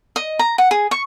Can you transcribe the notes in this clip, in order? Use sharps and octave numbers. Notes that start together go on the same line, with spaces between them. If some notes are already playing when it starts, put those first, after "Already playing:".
D#5
A#5
F#5
G#4
C#6